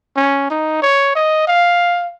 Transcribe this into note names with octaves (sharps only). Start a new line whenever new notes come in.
C#4
D#4
C#5
D#5
F5